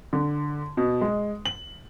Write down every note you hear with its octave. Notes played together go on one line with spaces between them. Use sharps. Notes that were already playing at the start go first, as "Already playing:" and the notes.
D3
B2
G#3
F#7